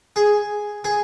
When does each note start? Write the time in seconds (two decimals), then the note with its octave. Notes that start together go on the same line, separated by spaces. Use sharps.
0.16 G#4
0.84 G#4